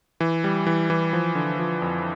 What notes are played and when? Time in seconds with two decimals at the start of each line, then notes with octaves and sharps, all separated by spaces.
0.20 E3
0.44 G3
0.67 E3
0.90 E3
1.13 F3
1.35 D3
1.59 F3
1.82 F2